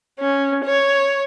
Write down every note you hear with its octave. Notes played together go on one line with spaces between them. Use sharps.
C#4
C#5